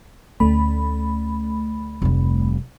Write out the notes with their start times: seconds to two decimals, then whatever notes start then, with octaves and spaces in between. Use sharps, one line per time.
0.40 D2 A3 C#4 B5
2.02 F1 G3